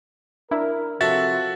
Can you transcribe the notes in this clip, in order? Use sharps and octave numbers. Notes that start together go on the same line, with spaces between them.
D4 E4 A#4
C3 F3 F#4 A4 E5 F#5 A6